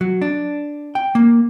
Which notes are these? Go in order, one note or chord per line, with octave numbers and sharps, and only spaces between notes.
F#3
D4
G5
A#3